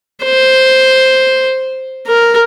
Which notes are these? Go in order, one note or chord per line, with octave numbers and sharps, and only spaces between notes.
C5
A#4